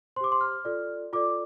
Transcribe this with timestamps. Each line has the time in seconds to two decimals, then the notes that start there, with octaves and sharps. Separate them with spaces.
0.16 C5 C6
0.21 G4 D6
0.32 C6
0.41 F6
0.65 F4 A4 D5
1.13 F4 A4 D5 D6